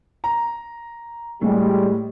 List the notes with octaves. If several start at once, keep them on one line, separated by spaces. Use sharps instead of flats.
A#5
A2 G3 G#3